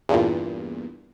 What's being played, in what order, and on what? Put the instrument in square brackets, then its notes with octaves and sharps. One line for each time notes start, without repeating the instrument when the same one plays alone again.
[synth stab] E2 G2 A#2